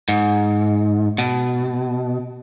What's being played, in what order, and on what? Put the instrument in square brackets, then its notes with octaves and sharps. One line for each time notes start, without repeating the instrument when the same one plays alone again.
[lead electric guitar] G#2
B2